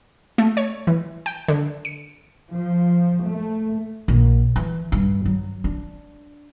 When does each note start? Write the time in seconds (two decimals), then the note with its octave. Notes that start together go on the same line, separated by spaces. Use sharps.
0.38 A3
0.57 C#5
0.87 E3
1.26 G5
1.48 D3
1.85 C#7
2.52 F3
3.25 A3
4.08 A#1
4.56 E3
4.92 G2
5.25 F#3
5.64 D4